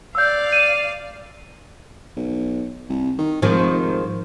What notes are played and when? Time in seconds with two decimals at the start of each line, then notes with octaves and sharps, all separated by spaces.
0.15 D5 F5 E6 G6
0.53 D#7 E7
2.16 B1
2.89 C2
3.19 D#3
3.42 F1 G#2 D#3 F3